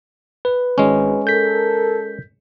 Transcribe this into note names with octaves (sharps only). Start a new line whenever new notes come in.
B4
G#1 G#3 C#4
A4 A#4 G6 B6